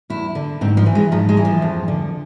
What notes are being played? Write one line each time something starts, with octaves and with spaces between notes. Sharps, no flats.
E2 E4
D3
G#2 C4
F3
E3
G#3
G#2 F3
G#3
E3
F3
F2
D3